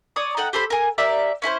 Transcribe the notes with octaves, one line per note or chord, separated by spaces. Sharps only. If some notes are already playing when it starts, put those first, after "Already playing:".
C#5 D5 D#6
D#4 A4 F#5 G5
G4 A4 C5 B5
A#4 G#5
G4 A#4 D5 E5
C#4 E4 A4 C5